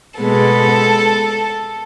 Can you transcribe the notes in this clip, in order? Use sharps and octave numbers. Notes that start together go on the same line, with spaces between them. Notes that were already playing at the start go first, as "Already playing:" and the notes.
B2 G#3 B3 A4